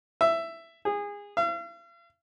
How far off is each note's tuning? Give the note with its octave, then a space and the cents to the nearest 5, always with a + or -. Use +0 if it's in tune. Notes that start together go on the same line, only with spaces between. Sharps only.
E5 +10
G#4 -25
F5 -45